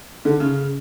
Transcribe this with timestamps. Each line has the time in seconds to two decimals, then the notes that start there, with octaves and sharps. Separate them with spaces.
0.25 D3
0.40 C#3